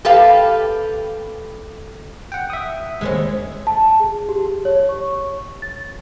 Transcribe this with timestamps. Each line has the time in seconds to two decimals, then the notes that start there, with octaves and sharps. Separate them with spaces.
0.05 G4 A4 B4 F5
2.32 F#5 G5
2.50 E5 D#6
3.01 D#2 G#3 B3 C#4
3.67 A5
4.00 G#4
4.29 G4
4.65 C#5
4.89 C#6
5.62 A6